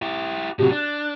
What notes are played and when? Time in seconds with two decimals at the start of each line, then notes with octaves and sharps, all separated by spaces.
0.02 E4 G4
0.59 A2 C3 F#3 F#4 G4
0.71 D4 F#6